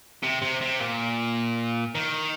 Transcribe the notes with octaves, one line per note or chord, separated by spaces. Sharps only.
C3
C3
C3
A#2
D#3